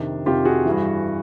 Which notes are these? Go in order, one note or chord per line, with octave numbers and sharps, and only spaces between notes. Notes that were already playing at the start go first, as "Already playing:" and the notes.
Already playing: F2 C3 D#3 D4
F2 C3 D#3 F4 G4
F#4 G#4
G2 E3